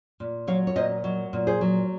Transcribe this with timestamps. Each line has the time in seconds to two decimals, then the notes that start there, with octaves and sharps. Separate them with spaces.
0.20 A#2
0.47 F#3 C#5 F5
0.67 C#5
0.76 A#2 C5 D#5
1.04 F#3
1.33 A#2
1.47 G#4 C5
1.61 F#3